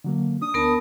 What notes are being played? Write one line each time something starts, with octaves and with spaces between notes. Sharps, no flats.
D3 F#3 A#3
D4 D#6
D2 B3 D4 A#4 A5 B5